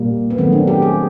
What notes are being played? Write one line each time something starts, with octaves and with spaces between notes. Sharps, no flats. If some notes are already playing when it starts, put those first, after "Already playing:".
Already playing: A#2 G3 A#3
B3
D#3 F#3 A3 C4
D4
G4
G#4